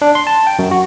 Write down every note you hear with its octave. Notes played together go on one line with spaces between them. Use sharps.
D4
C6
A5
G5
F#2
F#4